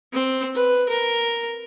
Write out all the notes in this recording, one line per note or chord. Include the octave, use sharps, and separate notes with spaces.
C4
B4
A#4